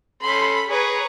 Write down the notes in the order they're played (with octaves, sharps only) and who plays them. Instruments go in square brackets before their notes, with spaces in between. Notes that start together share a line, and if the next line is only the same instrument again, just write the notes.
[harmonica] C#4 A4 C6 [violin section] B5
[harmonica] G#4 [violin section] B4 C#5 A#5